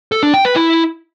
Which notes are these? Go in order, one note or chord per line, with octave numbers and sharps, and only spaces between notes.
A4
D4
G5
B4
E4